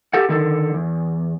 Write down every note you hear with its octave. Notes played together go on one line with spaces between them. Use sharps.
G4 A4 F#5
D3 D#3 A4
E2